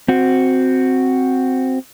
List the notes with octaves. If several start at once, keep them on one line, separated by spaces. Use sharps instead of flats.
C4 F#4